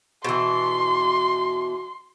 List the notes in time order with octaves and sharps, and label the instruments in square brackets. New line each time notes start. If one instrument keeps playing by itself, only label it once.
[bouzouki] B2 E3 [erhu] C6